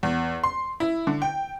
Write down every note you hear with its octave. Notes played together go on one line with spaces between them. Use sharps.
E2
C6
E4
D3
G5